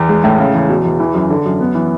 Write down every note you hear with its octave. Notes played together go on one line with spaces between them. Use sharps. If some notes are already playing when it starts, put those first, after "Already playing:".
Already playing: E2
G#3
A2
C#3
E2
B2
E2
E3
F#2
D3
F#2
B3
E3